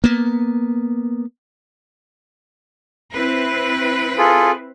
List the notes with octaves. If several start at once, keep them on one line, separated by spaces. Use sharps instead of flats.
A#3 B3
C4 E4 B4
F4 G#4 A4